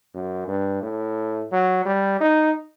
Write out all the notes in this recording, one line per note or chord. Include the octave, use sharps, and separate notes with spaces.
F#2
G2
A2
F#3
G3
D#4